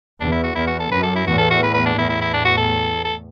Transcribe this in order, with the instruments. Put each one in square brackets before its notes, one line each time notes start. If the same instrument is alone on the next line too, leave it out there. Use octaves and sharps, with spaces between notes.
[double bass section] E2 [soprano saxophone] D4
[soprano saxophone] E4
F#4
[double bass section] E2 [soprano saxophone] E4
[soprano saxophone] F#4
A4
[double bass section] F#2 [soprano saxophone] B4
[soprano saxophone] A4
E4
[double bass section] E2 A2 [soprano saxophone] F#4
[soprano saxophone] A4
F#4
B4
B4
D4
[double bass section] E2 A2 [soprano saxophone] E4
[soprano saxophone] E4
E4
D4
F#4
A4
A4